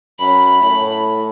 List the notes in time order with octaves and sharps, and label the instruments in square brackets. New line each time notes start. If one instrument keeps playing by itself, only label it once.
[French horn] F#2 [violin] B5
[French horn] A2 [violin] B5